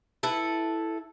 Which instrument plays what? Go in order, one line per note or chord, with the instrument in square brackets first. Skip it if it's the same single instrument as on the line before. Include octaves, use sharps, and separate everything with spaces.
[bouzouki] E4 A4 B4